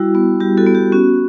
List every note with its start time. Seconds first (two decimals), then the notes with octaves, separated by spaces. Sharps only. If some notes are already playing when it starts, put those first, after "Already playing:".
Already playing: G3 E4 F#4
0.15 B3
0.40 G3 G4
0.58 F#4 A4
0.66 B3
0.75 G4
0.92 C#4 F#4